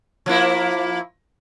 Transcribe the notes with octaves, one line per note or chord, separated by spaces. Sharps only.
F3 A#3 E4